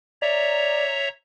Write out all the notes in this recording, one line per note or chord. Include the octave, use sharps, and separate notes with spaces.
C#5 D5 E5 A#5